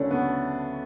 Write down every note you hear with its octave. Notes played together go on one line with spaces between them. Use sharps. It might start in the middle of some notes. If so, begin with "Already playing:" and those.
Already playing: D2 C#3 F#3 C#4 D4 A4
B3